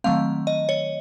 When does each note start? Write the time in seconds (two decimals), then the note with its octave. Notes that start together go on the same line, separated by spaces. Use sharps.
0.04 D#3 F#3 A3 C4 F5
0.47 D#5
0.69 C#5